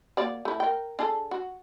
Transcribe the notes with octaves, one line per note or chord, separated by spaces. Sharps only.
A#3 F#4 D5
A3 E4
A#4 G5
D4 G#4 A4
F#4